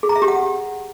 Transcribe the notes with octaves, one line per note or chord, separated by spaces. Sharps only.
G#4
A#5
E5
G4
F#5